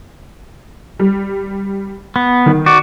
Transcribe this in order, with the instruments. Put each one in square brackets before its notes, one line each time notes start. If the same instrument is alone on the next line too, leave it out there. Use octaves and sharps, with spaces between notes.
[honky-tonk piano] G3
[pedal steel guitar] B3
[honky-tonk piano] D#3
[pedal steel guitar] F#4 D5